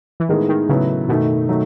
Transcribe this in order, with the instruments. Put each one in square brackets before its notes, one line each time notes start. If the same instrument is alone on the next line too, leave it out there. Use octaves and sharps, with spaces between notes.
[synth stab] E3
[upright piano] A2 G#3 B3 D#4 G#4 [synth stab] D#3
[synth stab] D#3
[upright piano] A2 F#3 B3 E4 [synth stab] C#3
[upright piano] F#2 D#3 A3 D#4 [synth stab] B2
[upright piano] D#3 F#3 A3 D#4